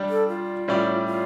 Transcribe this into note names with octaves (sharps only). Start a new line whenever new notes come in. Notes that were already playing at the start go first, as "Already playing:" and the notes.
Already playing: G3 D4 G4
A4
F4
A2 G3 C#4 G4 D5
F4